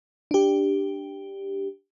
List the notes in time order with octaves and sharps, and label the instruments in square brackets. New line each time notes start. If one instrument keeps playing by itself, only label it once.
[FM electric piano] D4 G4